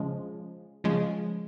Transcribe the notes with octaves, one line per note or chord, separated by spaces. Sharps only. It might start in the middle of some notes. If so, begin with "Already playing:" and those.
Already playing: C#3 F3 G#3
C#3 F3 G#3